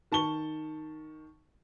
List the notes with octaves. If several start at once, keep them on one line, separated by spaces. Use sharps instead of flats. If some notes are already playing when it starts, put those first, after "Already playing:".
D#3 A5 C#6 G7